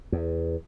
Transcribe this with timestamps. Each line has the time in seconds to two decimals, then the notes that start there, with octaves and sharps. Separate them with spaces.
0.12 E2